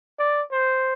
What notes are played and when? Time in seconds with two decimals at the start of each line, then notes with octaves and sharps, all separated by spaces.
0.19 D5
0.52 C5